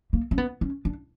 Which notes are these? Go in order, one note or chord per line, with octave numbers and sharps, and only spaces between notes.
A#3
C#4
B3
C#4
D4